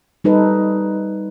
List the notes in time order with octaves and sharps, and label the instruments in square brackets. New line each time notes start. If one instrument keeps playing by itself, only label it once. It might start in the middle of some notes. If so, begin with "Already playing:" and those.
[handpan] G3 D#4 A4 B4